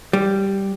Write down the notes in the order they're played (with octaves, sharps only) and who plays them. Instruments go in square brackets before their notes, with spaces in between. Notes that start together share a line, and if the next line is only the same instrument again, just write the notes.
[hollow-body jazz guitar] G3